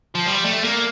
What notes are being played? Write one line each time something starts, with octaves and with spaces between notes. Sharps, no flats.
F3
G3
A3
A#3